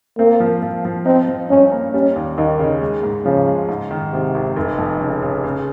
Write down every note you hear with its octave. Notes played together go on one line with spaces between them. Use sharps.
A#3 C4
F3
F3
F3
C4 D#4
F3
G2 C#4
A#3
G3 C#4
D#2
D#2 D#3
C#3
G#3
G#2
C#3 F3
G#3
G#2
D#3
G#1 C3
G#1
F1
F2
C#3
C#3
C#3